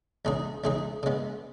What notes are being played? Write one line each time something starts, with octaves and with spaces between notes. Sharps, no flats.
E2 C#3 G#3 D#4 G#4
E2 C#3 G#3 D#4 G#4
C#3 G#3 B3